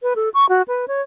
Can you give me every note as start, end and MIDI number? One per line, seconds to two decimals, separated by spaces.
0.03 0.14 71
0.16 0.29 69
0.34 0.46 85
0.49 0.62 66
0.68 0.86 71
0.88 1.02 73